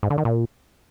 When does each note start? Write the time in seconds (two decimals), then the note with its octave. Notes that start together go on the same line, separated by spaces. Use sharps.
0.03 G#2
0.10 D3
0.18 D#3
0.25 A#2